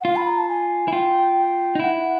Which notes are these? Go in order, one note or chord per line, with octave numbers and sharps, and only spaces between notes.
F#5
F4 F5
B5
A#5
A5
G#5
E4
F4 G5
D#4
E4 F#5